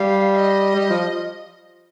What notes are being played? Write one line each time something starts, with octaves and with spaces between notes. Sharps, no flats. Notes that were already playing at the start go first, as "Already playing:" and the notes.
Already playing: G3 F5
F5
D#5
G3
F3